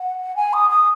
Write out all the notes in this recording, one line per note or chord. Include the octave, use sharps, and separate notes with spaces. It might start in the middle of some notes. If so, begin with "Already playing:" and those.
Already playing: F#5
G#5
D#6
D#6